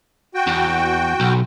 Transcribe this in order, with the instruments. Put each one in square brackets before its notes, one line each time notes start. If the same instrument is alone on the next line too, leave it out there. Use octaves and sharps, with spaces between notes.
[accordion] F#4 G5
[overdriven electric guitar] E2
B1